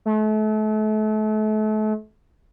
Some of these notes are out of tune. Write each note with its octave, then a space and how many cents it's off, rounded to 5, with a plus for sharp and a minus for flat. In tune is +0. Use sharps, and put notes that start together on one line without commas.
A3 -35